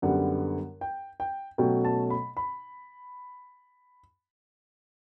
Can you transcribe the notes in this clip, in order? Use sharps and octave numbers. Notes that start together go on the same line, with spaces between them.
F#2 D3 G3 B3 F#5
G5
G5
B2 F#3 A3 C#4 G5
A5
B5
B5